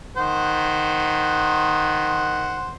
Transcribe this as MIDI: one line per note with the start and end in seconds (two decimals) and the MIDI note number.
0.17 2.74 51
0.17 2.74 72
0.17 2.74 78